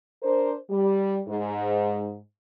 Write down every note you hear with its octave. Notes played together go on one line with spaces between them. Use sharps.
D4 A#4 C5
G3
G#2